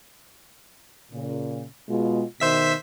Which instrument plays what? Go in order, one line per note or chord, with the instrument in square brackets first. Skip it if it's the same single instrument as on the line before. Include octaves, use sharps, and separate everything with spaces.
[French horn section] A#2 C#3
B2 G#3 F4
[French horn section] B2 D#3 [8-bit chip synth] C5 E5 B6